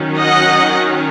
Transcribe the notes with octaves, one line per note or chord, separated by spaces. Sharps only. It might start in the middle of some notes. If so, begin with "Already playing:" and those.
Already playing: D#3 F#3 C#4
D#5 F#5